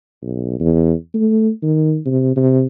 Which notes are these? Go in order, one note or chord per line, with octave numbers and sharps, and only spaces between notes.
B1
E2
A3
D#3
C3
C3